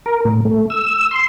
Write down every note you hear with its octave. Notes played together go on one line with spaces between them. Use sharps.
A#4
A2
A3
E6
C6